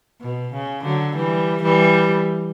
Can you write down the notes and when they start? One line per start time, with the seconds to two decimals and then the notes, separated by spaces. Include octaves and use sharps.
0.21 B2
0.53 C#3
0.84 D3 F#3
1.15 E3 G3
1.62 E3 G3